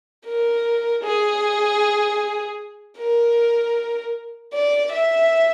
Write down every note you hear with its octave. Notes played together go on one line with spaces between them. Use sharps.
A#4
G#4
A#4
D5
E5